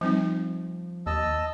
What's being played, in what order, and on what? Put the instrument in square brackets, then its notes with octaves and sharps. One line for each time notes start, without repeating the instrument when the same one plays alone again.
[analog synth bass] F3 [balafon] G3 C4 D#4
[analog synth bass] D#2 [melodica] D#5 A5 E6